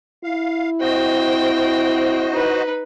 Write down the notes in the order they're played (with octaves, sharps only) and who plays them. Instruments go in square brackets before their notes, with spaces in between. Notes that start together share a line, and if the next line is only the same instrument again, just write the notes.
[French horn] E4 [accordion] F5
[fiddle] C4 G5 [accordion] F#4 C5 D#5
[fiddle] D#4 B4